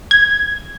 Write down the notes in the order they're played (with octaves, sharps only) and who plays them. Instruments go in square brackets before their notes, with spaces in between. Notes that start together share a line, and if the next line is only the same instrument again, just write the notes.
[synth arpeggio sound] G#6